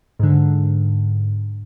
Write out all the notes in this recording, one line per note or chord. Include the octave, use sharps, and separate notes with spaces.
G#2 D3